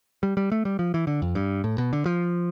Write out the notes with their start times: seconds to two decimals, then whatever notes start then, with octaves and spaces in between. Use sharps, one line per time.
0.23 G3
0.37 G3
0.52 A3
0.65 G3
0.79 F3
0.94 E3
1.07 D3
1.22 F2
1.35 G2
1.64 A2
1.78 B2
1.93 D3
2.06 F3